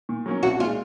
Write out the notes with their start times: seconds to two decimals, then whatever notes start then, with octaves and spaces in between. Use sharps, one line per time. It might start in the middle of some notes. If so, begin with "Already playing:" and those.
0.09 A#2
0.26 F#3 A#3 C#4
0.43 C2 F#4
0.60 A#2 F4
0.63 G#3